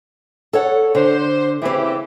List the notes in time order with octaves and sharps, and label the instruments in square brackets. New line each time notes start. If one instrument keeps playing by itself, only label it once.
[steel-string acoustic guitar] A4 C#5 F#5
[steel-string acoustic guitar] D3 [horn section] C5
[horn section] C#3 E3 G4 [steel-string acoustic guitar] C4 E4